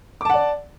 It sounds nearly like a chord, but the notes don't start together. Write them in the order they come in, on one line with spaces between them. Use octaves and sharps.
D6 A5 F#5 D5